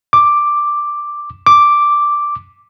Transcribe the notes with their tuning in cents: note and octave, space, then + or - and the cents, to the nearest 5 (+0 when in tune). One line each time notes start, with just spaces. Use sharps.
D6 +5
D6 +0